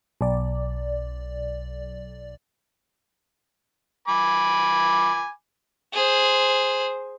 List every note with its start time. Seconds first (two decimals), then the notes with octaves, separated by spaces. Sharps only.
0.21 B1 D5
4.08 G#5 B5 D6
5.94 G#4 C5